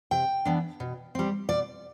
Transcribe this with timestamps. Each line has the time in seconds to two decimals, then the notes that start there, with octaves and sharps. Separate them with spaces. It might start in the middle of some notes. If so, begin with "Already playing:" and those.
0.11 C3 G5
0.45 E3 B3 D4
0.80 B2
1.15 G3 C4
1.49 B2 D5